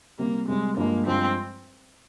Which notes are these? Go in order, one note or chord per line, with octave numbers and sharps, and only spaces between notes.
C3 G3 A#3 C4
C3 G3 G#3 C4
G2 F3 G#3 A#3
G2 F3 G#3 C4